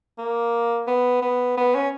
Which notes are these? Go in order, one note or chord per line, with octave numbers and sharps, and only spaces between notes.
A#3
B3
B3
B3
C#4